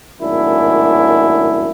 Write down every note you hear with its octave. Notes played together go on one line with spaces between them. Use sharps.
G#1 F#2 A2 A#3 D4 E4